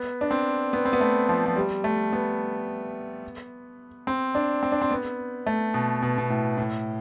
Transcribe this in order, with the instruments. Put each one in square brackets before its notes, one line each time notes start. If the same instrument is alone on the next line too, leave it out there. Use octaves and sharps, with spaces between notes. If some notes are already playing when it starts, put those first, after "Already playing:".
Already playing: [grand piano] B3
D4
C4
B3
C4
B3
A3
F3
F3
G3
A3
B3
C4
D4
C4
D4
C4
B3
A3
B2
B2
B2
A2
A2